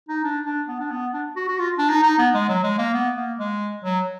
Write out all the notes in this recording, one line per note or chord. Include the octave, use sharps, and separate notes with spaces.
D#4
D4
D4
B3
D4
B3
D4
F#4
F#4
F4
D4
D#4
D#4
B3
G#3
F#3
G#3
A#3
B3
A#3
G#3
F#3